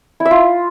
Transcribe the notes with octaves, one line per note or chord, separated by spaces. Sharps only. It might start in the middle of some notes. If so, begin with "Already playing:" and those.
E4
E5
F4